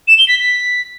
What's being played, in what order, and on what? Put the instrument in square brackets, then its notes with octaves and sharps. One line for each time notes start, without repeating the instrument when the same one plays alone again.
[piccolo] E7
G7
B6
B6